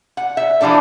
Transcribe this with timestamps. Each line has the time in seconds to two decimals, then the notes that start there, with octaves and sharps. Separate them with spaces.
0.17 F#5
0.37 E5
0.61 E3 F3 G3 D4 A4